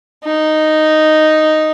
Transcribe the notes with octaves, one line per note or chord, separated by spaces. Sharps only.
D#4